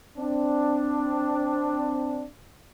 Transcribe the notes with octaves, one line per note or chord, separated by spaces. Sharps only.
C4 D4